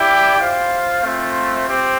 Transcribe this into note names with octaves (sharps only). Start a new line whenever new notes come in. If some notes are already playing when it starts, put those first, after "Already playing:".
Already playing: E4 G4 D5 G5
F4 C5 F5
A3 C4 F4 C5
C4 G4